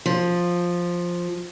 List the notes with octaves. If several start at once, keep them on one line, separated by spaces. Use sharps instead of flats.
F3